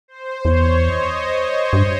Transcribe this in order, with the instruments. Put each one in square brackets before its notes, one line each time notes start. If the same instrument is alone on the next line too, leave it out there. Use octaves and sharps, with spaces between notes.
[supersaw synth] C5
[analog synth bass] E2 [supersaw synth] C#5
[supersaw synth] D#5
[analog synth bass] G2